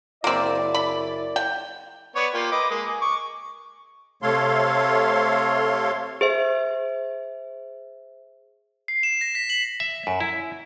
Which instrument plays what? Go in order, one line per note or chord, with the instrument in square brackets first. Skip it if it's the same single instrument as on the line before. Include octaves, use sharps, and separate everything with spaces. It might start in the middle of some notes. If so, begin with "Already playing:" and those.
[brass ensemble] F#1 E4 D5 [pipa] A#3 C4
[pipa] B5
G5
[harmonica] B3 C#5 D5
A#3 F4 G4
B4 D#5 D6
G#3 A#3 A#4
G#4
C#6 D6
[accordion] C3 A3 A4 C#5 F5 C6
[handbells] G#4 C5 E5
[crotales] C7
E7
A#6
B6
F#7
[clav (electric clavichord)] E5
F#2
E4